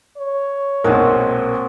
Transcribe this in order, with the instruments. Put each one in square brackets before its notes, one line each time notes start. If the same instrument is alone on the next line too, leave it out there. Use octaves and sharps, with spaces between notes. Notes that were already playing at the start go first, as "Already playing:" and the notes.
[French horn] C#5
[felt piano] B1 A#2 [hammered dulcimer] G#3 C4 F#4 [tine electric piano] A#4